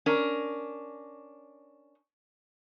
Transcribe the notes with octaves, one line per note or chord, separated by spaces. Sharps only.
C#4 D4 A#4